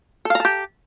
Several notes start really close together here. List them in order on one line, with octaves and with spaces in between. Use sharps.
A4 F5 A#5 A5 G4